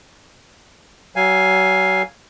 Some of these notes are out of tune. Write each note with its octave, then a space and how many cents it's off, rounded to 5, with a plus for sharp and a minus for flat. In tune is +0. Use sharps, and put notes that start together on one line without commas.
F#3 +35 F5 +0 G#5 +0